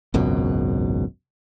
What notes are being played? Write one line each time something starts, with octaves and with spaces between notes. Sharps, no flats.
G#1 C#2 F#2 B2